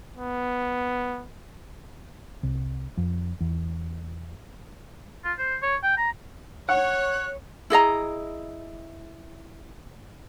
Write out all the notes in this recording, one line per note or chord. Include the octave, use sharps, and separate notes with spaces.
B3
C2
F2
E2
F4
C5
C#5
G5
A#5
C#5 F#5 F#6
E4 G#4 D#5 A#5